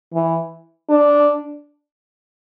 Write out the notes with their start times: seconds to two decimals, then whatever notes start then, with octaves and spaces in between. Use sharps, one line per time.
0.14 E3
0.90 D4